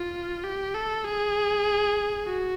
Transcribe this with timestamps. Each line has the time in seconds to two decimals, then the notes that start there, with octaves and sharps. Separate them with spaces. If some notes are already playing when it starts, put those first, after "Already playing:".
Already playing: F4
0.44 G4
0.74 A4
1.04 G#4
2.26 F#4